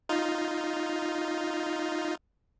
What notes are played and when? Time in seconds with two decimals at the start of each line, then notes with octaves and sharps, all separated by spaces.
0.09 D#4 F4